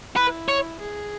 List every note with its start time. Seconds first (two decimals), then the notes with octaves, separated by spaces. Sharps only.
0.16 E4 B4
0.48 C#5
0.80 G#4